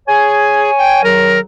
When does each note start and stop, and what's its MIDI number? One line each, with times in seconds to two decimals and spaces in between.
0.08 0.71 68
0.08 1.01 73
0.08 1.01 80
0.78 1.04 79
1.04 1.39 37
1.04 1.39 51
1.04 1.39 54
1.04 1.40 70